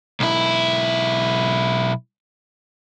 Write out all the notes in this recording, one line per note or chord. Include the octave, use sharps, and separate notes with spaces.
B1 E4